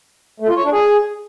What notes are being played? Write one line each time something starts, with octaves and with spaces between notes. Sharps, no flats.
A3
F4
C#5
D4
G#4